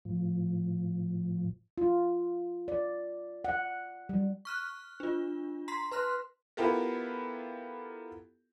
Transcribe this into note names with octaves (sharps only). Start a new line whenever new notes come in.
A2 F3
F4
D5
F#5
G3
C#6 F6 F#6
D4 F4
A#5 C6 B6 C7
B4 C6 F6 F#6
B3 E4 F4 G4 A4 A#4